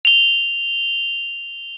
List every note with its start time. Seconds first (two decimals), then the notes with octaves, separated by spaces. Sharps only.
0.05 F7 G7